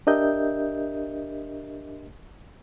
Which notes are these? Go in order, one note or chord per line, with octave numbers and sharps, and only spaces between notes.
D4 G4 A#4 D#5 E5 G6